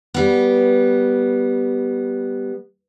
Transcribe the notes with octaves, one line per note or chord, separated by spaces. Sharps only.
G3 B3